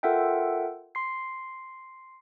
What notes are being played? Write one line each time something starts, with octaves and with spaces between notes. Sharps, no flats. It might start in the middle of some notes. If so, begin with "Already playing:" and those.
F4 A4 A#4 E5 F#5 G5
C6 C7